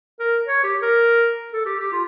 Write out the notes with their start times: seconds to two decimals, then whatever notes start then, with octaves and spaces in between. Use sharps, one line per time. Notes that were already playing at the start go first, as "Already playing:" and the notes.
0.20 A#4
0.47 C#5
0.64 G4
0.82 A#4
1.53 A4
1.66 G4
1.79 G4
1.92 F4